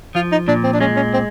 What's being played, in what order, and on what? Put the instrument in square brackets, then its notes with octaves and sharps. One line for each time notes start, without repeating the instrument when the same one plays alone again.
[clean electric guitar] F3 [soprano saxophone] F4
[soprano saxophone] D#4
[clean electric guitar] A#2 [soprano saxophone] D4
[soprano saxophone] C4
D4
[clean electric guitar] G#3 [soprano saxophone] C#4
[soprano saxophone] C#4
C4